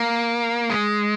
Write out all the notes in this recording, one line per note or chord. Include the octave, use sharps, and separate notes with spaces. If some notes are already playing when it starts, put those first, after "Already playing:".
Already playing: A#3
G#3